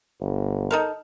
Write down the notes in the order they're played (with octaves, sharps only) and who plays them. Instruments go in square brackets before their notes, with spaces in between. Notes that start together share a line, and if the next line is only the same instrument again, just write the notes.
[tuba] G1
[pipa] D#4 A4 A#4